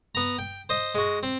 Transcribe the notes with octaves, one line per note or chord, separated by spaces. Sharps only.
B3 A#5
G5
C5 D#5
G#3 F#4
C4